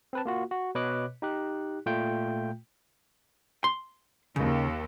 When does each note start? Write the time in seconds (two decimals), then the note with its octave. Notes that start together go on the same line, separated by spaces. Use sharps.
0.13 C4 B4 A5
0.25 A#3 F4 F#4
0.51 F#4
0.75 B2 B4 C#5 D#5 D6 F#6
1.22 D#4 G4 F#6
1.86 A#2 A3 F4 G5 G6
3.64 C6
4.36 D#2 C#3